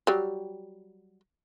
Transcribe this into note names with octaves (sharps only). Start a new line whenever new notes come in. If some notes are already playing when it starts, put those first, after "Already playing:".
F#3 G3